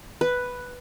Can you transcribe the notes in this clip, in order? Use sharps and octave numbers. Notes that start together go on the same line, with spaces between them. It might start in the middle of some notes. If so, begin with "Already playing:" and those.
B4